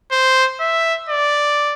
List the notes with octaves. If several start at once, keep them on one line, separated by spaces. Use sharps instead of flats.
C5
E5
D5